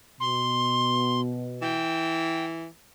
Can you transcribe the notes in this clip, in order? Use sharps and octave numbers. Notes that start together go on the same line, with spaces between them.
B2 C6
E3 G5